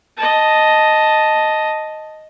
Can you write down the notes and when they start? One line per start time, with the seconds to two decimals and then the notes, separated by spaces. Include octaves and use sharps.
0.17 D#5 A5